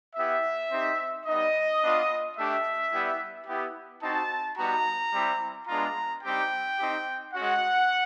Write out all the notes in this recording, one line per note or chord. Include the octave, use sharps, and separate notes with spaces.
B3 E4 G4 E5
C4 D#4 G4
G3 B3 D#4 D#5
B3 D4 F4
A3 D4 G4 E5
G3 B3 E4 G4
B3 E4 G4
C4 D#4 F#4 A5
G3 B3 D#4 F#4 A#5
G3 C4 E4 G4
G#3 B3 D4 F4 A#5
G3 C4 D#4 G4 G5
C4 D#4 G4
G#3 C#4 F#4 F#5